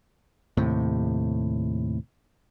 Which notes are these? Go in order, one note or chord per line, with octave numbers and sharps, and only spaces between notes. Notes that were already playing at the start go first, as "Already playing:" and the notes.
D#2 A2 C3